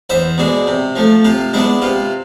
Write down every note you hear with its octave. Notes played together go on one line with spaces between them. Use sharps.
E2 C5 E5
B2 G#3 D4
C3
F3 A3
C3 F4
G#3 B3 D4 E4
C3 F4